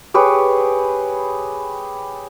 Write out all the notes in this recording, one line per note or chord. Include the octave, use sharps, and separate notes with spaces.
G4 G#4 B4 C#5